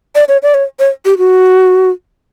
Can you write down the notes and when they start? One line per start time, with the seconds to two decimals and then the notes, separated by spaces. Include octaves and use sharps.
0.15 D5
0.28 C#5
0.43 D5
0.54 C#5
0.79 C#5
1.05 G4
1.18 F#4